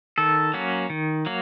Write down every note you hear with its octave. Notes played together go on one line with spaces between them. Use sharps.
D#3 A4
F#3 A#3 C#4
D#3
F#3 A#3